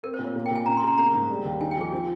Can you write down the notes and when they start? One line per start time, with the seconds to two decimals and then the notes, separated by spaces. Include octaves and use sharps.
0.03 C4 A#4
0.14 C5
0.19 A#2
0.24 C#5
0.35 A#3
0.46 G5
0.51 A#2 G#5
0.66 C#4 A#5
0.77 C6
0.83 C#3 A#5
0.98 A#3 A#5
1.14 G#2
1.30 G3
1.45 D#2
1.61 D#4 G#5
1.71 G5
1.77 F3 G#4
1.92 F3